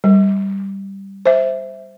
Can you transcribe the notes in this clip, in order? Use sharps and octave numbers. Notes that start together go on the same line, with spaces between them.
G3
C5 E5